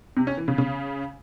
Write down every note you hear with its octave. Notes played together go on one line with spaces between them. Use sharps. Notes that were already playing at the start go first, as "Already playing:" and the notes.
C3
C#4
E3
C#3
C#3